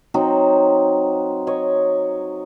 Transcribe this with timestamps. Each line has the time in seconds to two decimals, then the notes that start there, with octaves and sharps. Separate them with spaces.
0.14 F#3 C4 D#4
1.47 C#5 D#5